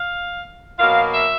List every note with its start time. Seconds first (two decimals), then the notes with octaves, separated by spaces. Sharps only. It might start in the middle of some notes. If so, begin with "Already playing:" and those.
Already playing: F5
0.79 B2 F#3 A#3 F5
1.13 E5